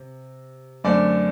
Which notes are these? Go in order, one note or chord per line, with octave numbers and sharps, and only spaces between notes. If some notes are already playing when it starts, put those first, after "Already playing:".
Already playing: C3
F#2 D3 A3 C4 D5